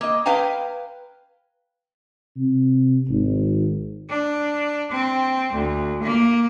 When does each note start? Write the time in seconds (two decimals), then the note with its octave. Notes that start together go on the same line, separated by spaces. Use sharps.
0.01 A#3 D#5
0.26 B4 F5 G5 G#5 A#5
2.36 C3
3.09 G#1
4.09 D4
4.92 C4
5.53 D2
6.03 A#3